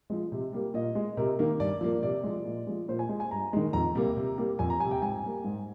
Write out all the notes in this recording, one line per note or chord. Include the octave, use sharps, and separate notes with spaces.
F3 G#3
C3
G3 A#3
A#2 D#5
G#3
C3 A#4
D#3 A#3
G2 D5
F3 A#3
C3 D5
F3 G#3
A#2
F3 G#3
A#2 C5
G#5
G#3
G#5
G2 A#5
D#3 G#3
F2 A#5
C3 G3 A#3
C3
G3 A#3
F2 G#5
A#5
C3 G3 G#5
G5
G#2 G#5
G3 A#3
G#2